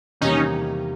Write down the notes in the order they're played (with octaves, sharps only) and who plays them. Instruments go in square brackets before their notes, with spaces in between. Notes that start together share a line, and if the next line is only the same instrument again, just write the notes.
[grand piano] E2 C3 D#3 G3 A#3 [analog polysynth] C#4 D#4